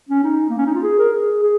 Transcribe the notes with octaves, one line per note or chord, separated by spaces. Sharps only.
C#4
D#4
A#3
C#4
D#4
F4
G#4
A#4
G#4
G#4